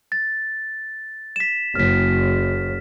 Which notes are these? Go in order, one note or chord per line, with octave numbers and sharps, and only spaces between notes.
A6
B6 E7
F#1 F6 B6